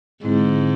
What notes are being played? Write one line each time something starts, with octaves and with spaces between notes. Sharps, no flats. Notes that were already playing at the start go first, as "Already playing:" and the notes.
G#2 D3 G#3 C4 E4